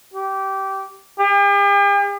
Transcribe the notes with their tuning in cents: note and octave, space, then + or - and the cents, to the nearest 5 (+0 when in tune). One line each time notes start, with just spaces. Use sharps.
G4 -20
G4 +45